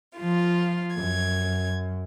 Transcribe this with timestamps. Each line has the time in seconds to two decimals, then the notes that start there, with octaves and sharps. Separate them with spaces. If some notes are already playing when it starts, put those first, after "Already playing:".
0.18 F3 F4
0.95 F#2 G#6